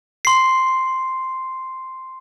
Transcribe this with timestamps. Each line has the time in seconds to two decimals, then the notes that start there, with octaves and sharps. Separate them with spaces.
0.25 C6 C7